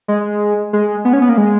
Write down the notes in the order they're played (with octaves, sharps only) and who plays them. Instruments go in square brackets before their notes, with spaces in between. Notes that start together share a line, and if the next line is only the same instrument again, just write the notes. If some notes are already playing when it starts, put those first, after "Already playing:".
[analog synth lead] G#3
G#3
B3
C#4
B3
A#3
G#3